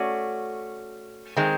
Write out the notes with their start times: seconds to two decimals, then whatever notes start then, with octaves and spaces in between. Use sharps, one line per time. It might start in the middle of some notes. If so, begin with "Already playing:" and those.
Already playing: A3 C#4 F#4 D5
1.37 D#3 G#3 C4